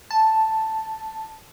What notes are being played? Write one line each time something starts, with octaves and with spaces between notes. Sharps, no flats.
A5